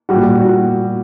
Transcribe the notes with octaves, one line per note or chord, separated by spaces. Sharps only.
A#2 G3 F#4
F#4